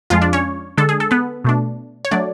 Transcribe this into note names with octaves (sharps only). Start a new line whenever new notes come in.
F2 F3 G#3 F4 F5
D4 D5
C#4 C#5
D3 G#3 D4 A4
G#4
A4
B3 B4
B2 A3 D4
C#5
F#3 A3 D4 D5